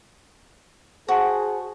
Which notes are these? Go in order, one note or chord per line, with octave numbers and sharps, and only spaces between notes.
F#4 G#4 C5 F#5 A5